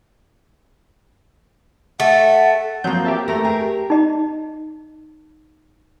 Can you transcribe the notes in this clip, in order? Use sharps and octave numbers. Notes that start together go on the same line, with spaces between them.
A3 F#5
F3 F#3 A#3 C4 G6
G4 E5 A5
A3 A#4 A#5
G4 G#4 A#4
D#4 D#5